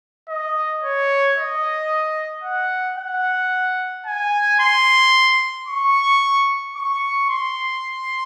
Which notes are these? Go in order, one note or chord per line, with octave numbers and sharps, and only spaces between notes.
D#5
C#5
D#5
F#5
F#5
G#5
C6
C#6
C#6
C6